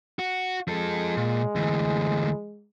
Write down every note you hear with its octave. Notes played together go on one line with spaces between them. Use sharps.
F#4
F3 G#3 A4
A#2
D2 E3